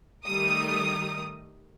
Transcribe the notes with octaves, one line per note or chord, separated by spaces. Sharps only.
D#3 G3 A3 A#4 D#6